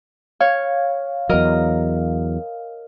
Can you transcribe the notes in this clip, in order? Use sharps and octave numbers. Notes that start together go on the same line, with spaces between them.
C#5 F5
E2 F#3 A#4 D#5